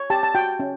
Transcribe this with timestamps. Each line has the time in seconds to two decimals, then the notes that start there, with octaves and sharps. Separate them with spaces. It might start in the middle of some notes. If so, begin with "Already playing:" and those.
Already playing: C#5
0.10 G4 A5
0.23 A5
0.35 F#4 G5
0.60 C#4